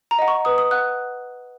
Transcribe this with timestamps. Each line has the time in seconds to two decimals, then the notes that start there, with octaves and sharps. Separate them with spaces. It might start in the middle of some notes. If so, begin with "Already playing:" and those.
0.11 A#5
0.19 D#5 F#5
0.28 C#6
0.45 B4 D#6
0.58 D#6
0.71 F#5 F#6